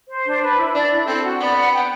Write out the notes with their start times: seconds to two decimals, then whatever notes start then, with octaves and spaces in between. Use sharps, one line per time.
0.10 C5
0.26 D4
0.42 B4
0.58 E4
0.75 D4 D5
0.91 E4
1.07 C4 A4
1.24 F#4
1.40 B3 D5
1.57 F#5
1.72 G5